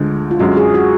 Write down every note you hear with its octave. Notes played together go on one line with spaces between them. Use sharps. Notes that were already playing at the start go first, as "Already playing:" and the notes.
Already playing: D2 D3 G#3 F4
F4
F#2 D3 G#3 F#4
G#4
F#4